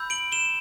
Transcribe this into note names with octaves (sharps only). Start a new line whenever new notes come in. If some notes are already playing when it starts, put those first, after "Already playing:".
Already playing: B5 E6 G6
D7 F#7
E7 G7